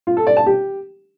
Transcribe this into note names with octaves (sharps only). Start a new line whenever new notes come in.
F4
A4
D5
A5
G4